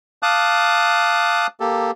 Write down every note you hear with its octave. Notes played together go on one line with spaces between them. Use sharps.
F5 A5 D6 D#6 F#6
A#3 G4 A4